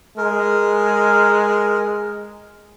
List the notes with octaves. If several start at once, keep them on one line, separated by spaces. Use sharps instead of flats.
G#3 A#4